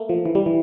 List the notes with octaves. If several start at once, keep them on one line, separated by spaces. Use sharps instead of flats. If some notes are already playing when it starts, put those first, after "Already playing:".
Already playing: A3 A#3
F3
E3
G3
E3